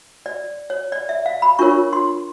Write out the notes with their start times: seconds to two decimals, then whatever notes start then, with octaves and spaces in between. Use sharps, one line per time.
0.26 D5
0.70 C#5
0.92 D5
1.09 E5
1.26 F5
1.42 B5
1.59 D4 F4 A#4 C#5 C#6
1.93 C6